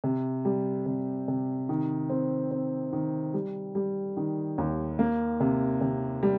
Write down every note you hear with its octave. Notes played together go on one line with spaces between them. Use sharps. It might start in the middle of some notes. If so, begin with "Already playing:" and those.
C3
G3
C3
C3
D#3
C4
C4
D#3
G3
G3
D#3
D#2
A#3
C3
C3
G3